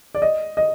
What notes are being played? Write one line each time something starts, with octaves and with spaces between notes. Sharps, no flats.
D5
D#5
D#5